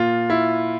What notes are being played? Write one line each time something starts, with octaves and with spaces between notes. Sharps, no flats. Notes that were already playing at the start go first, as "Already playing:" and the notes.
Already playing: A#2 F4
E4